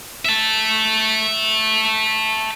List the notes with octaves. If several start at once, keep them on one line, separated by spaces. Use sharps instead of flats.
E5 A5